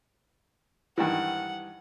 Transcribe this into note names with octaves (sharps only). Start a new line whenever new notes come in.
G2 D#3 E3 F#5